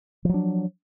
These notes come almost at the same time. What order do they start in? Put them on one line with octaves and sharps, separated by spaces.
F3 F#3 D4